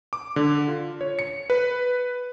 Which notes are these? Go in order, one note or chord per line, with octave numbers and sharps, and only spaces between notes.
D6
D3
F4
C#5
C#7
B4